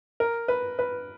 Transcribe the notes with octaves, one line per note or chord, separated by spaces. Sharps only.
A#4
B4
B4